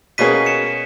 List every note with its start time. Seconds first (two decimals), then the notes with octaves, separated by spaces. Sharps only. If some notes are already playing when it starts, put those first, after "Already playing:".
0.18 B2 A#3 C#4 G#4 B6 D#7
0.46 C#7 E7